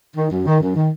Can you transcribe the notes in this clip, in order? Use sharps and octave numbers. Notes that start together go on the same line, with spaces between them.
D#3
F#2
D#3
F#2
D#3